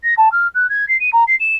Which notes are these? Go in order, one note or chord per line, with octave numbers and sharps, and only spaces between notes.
A#6
A5
F6
F#6
G#6
C7
D#7
A#5
C7
E7